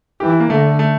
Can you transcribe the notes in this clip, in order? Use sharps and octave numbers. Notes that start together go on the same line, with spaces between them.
E3 G4
E4
A#3
D3 A3
A3